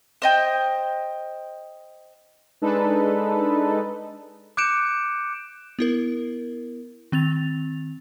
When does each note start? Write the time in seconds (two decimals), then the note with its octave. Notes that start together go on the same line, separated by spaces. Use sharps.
0.22 C5 D#5 G5
2.62 G#3 D4 D#4 A4 B4
4.57 D6 F#6 G6 C#7 D7 E7
5.79 B3 E4 A#4
7.12 D#3 C4 A6 F7